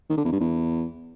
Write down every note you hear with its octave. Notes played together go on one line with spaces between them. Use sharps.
D#3
D3
E2
G2
E2